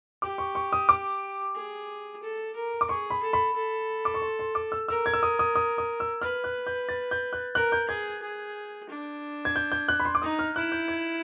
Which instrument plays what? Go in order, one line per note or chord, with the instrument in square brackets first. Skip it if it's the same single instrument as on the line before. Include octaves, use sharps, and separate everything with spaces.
[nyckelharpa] G4 [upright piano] D6
[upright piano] C#6
C#6
D#6
D6
[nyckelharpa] G#4
A4
A#4
[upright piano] D6
[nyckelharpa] G#4 [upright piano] C#6
[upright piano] B5
[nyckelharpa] A4
[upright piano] B5
[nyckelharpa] A4
[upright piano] D6
C#6
C6
C6
D6
E6
[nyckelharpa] A#4 [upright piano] E6
[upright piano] G#6
E6
D#6
D#6
D#6
D#6
E6
[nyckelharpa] B4 [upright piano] F6
[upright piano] F#6
G6
A6
G6
F#6
[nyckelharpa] A#4 [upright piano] F#6
[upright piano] G6
[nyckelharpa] G#4 [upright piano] G#6
[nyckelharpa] G#4
D4
[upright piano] G#6
G6
G6
F#6
B5
C6
D6
[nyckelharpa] D#4 [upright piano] D#6
[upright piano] F6
[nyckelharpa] E4 [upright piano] F#6
[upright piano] G6
G#6